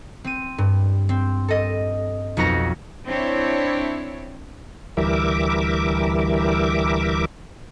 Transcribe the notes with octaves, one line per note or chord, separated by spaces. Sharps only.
C4 D#7
G2
C4
A4 D#5
B1 F2 D#4 F#4 A#5 A#6
C4 D4 E4 C#5
D2 E3 G3 A#4 E5 D6